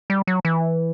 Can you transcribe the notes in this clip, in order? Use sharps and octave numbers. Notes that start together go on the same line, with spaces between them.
G3
F#3
E3